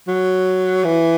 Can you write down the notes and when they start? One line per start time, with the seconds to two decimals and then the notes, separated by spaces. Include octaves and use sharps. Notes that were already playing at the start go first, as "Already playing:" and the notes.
0.08 F#3
0.84 E3